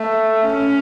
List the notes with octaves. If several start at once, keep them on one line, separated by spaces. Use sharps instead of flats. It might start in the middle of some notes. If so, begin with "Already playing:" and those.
Already playing: A3
C#4